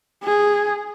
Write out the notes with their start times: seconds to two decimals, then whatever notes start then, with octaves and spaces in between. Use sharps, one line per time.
0.23 G#4